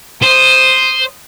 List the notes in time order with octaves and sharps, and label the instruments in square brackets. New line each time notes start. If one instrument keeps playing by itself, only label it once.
[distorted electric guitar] C5 [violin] D#6